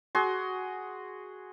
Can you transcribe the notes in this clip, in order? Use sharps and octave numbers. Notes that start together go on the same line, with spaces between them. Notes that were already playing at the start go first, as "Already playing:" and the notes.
F#4 G#4 C6